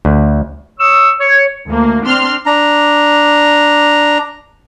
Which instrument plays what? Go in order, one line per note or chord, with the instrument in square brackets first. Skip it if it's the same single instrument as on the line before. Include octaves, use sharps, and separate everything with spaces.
[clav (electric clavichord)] D2
[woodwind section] C#5 C#6 D#6 E6
C#5
[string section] D2 A#3
C4 D4 C6 F6
[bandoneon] D4 A#5